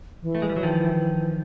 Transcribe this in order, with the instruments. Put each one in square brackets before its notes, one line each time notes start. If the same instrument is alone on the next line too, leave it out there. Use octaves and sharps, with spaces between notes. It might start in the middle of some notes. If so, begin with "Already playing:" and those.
[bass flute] E3
[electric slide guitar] A3
G#3
G3
F#3
D#3 F3